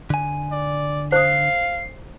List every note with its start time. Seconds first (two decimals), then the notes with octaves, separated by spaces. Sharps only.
0.10 D3 G#5
0.52 D5
1.12 C5 F5 D#6 C7